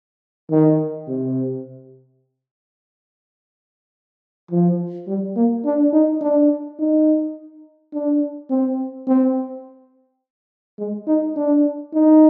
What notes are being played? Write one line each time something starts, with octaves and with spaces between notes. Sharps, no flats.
D#3
C3
F3
G3
A#3
D4
D#4
D4
D#4
D4
C4
C4
G#3
D#4
D4
D#4